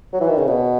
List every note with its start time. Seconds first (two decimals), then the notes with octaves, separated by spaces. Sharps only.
0.13 F#3
0.21 E3
0.29 D#3
0.38 C#3
0.47 B2